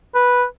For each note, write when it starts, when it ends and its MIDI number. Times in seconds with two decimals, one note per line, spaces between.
0.15 0.45 71